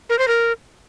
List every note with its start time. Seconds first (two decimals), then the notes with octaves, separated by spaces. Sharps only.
0.10 A#4
0.19 C5
0.28 A#4